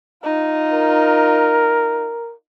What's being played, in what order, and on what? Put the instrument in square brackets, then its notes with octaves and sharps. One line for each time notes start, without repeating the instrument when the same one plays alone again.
[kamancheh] D#4 F4
[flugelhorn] A#4